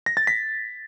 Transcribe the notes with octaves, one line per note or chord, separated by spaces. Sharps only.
A#6
A6
B6